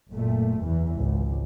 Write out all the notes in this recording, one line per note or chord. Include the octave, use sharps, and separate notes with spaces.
F#1 A#2 A3
E2 E3
G#1 C#2